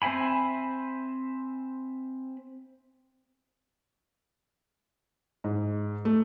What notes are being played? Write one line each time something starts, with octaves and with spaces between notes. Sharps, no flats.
C4 C5 E5 G#5 B5
G#2
A3